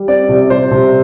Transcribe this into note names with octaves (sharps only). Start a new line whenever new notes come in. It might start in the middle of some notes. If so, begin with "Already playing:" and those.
Already playing: G3
C4 D5
C3
G3 C5
C3